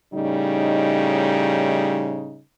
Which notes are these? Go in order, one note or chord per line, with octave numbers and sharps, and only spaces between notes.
A2 C#3 G3 D#4